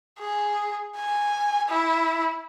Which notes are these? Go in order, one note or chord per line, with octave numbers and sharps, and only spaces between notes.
G#4
G#5
E4